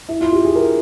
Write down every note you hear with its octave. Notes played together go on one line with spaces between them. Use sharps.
E4
F4
G4
G#4
A#4